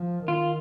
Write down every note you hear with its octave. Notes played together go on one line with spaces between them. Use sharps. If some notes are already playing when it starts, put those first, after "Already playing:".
Already playing: F3
D#3 F4